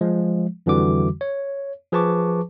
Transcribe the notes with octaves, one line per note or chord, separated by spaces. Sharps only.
F3 G#3
F2 D3 E3 G3 F#4 D6
C#5
F3 G#4 B4 A5 C#6 D6